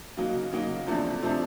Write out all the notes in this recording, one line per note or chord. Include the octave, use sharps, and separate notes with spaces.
C#3 F#3 A#3 D#4 F#4
C#3 F#3 A#3 D#4 F#4
E2 C3 F3 A3 D4
C3 F3 A3 D4